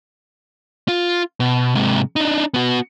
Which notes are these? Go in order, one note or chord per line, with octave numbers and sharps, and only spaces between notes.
F4
B2
G#2 C3
D4 D#4
B3 F#4